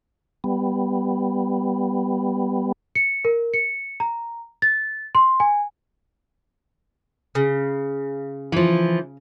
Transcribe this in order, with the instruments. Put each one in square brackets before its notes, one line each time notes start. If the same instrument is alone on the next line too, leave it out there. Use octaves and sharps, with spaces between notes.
[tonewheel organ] G3 B3
[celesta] C#7
A#4
C#7
A#5
A6
C6
G#5
[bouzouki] C#3
[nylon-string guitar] E3 F3